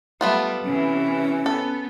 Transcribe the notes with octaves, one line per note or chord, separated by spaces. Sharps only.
G3 A3 B3 F4
C3 E3 C#4
B3 A4